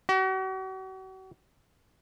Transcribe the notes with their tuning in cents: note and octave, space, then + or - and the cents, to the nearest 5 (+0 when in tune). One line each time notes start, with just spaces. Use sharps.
F#4 +40